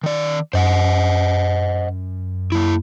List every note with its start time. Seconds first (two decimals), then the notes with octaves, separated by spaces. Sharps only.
0.04 D#3 D5
0.53 F#2 C5 D#5 F#5
2.52 F#2 A#3 E4